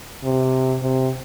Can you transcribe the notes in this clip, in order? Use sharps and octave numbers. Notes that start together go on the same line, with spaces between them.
C3
C3